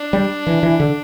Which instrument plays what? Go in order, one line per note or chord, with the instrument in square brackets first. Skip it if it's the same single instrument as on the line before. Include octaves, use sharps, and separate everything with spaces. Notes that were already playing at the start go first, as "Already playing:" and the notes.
Already playing: [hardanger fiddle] D4
[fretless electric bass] G3
E3
E3
D3